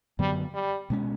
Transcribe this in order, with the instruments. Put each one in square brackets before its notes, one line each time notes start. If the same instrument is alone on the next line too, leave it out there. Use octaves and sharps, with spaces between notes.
[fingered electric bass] F#2 D3 F#3 B3 [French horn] G3
[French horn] G3
[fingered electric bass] B2 G#3 C#4